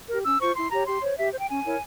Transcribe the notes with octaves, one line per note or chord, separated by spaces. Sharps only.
G4 A#4
C#4 E6
F4 C5 C#6
E4 C6
G4 C#5 A#5
G4 C6
C5 C#5
G4 E5
C5
G5
C#4 G#5
E4 A#4 C#5